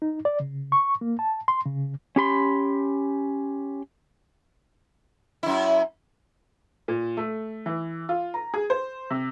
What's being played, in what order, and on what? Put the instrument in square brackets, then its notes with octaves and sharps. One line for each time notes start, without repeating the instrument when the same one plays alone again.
[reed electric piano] D#4
D5
C#3
C#6
A#3
A5
C6
C#3
[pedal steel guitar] C#4 G4 B5 C6
[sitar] F#2 E4
[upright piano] A#2
A3
E3
F4
A#5
G#4
C5
C3